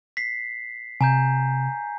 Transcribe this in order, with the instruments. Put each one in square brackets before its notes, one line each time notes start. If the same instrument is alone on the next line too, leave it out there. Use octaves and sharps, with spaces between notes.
[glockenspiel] B6 C7
[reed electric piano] C3 [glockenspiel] G#5 A#5 G6